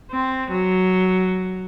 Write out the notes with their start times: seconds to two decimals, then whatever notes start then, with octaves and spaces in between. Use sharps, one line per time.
0.11 C4
0.51 F#3